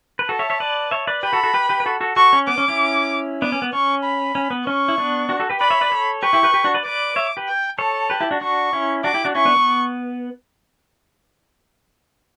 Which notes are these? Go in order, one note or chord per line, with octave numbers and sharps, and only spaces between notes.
B4
F#4 A4 A5
C#5 E5
C#5 E5
B4 D5
C#5 E5
B4 D5
G4 B4 B5
F#4 A4
F#4 A4
G4 B4
G4 B4
B4
F#4 A4
F#4 A4
F#4 A4 C#6
C#4
B3 D6
C#4
C#4 E4
B3 D4 D6
C#4
B3
C#4 C#6
B5
C#4
B3
C#4 C#6
E4
B3 D4
D4 F#4
F#4 A4
G4 B4
B4 D5 B5
C#5 E5
B4 D5
A4 C#5
G4 B4 C#6
E4 G4
G4 B4
G4 B4
D4 F#4
B4 D5
B4 D5 D6
C#5 E5
G4 B4
G5
A4 C#5 A5
G4 B4
E4 G4
D4 F#4
D4 F#4 C#6
C#4 E4
D4 F#4 D6
E4 G4
D4 F#4
C#4 E4 C#6
B3 D4
B3